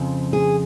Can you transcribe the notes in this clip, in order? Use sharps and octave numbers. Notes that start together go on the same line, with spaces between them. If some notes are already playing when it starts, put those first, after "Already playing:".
Already playing: F2 C#3 F3
G#4